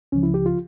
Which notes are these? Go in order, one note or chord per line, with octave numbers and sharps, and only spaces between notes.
C#2 C#3 F3 C#4
E4
G4
F4